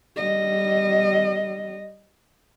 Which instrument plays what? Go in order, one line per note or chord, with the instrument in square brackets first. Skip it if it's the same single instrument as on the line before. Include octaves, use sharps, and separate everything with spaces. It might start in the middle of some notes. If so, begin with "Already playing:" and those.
[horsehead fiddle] G3 D#5